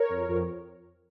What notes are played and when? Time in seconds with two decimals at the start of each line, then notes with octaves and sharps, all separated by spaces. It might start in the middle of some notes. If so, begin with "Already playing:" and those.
Already playing: A#4 C#5
0.09 F2
0.28 F2